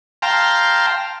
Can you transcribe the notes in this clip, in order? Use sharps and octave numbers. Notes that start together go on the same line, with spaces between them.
F5 G5 A5 A#5 C6